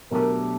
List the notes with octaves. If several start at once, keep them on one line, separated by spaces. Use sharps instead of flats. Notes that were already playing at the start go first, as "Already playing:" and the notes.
B2 F#3 A3 D4 G4 A#4